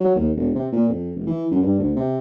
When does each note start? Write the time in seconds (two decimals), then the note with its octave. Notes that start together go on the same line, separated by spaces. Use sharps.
0.01 F#3
0.16 D#2
0.36 E1
0.55 C3
0.72 A#2
0.89 F2
1.15 F1
1.27 E3
1.51 F#2
1.62 G2
1.79 D2
1.96 C3